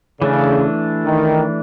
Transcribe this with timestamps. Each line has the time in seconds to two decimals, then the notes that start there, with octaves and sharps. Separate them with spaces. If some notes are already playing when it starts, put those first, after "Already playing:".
0.21 C#3 E3 A3 D4
1.05 D#3